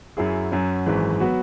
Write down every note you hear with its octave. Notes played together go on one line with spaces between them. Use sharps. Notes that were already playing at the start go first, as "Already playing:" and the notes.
F#2 F#3 E4 G#4
F#2 F#3 C#4
G#1 F#2 E3 G#3
F#3 B3 F#4